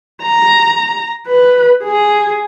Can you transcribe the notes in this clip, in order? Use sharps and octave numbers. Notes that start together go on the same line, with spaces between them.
A#5
B4
G#4